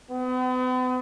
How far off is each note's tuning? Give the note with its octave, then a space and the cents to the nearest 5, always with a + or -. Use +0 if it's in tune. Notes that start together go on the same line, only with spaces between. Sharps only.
B3 +45